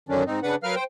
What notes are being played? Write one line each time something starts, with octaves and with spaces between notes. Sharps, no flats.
F#2 D3 D#3 F#3 C#4 D4
G#2 C4 D#4
C#3 D4 B4 F#5
F#3 A#4 B4 F5 F6
C5 G5